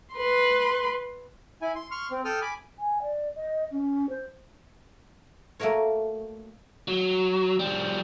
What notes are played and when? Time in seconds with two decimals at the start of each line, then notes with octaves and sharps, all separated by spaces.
0.14 B4 C6
1.62 E4 G#5
1.75 C6
1.91 C6 C#6 F6
2.11 C4
2.25 A4 G5 D#6 F6
2.42 G#5 B5 D6
2.79 G#5
3.02 D5
3.36 D#5
3.71 C#4
4.09 C5
5.60 A3 A#3 F#4 A#4 C#5
6.88 F#3
7.60 F3 G3